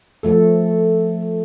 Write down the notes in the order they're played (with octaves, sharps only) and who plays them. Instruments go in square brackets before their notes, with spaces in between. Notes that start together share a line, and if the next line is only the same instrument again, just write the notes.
[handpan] F3 A3 A4